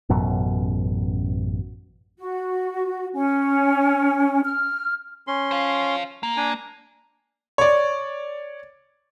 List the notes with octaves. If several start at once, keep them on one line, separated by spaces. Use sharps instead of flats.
A1 F#2 B2
F#4
C#4
F6
C#4 C6
C5 F5
A#3
D4 G#5
C#5 D5